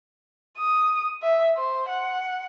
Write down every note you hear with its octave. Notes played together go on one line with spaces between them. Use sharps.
D#6
E5
C5
F#5